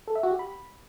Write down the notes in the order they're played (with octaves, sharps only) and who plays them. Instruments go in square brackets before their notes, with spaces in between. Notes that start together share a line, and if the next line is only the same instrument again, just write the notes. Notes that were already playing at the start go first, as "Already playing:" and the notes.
[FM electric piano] A4
E5
F#4
G4
B5